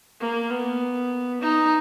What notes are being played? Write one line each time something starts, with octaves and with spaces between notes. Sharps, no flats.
A#3
B3
D#4